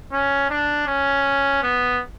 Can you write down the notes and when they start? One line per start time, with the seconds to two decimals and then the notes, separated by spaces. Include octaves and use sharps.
0.12 C#4
0.50 D4
0.87 C#4
1.63 B3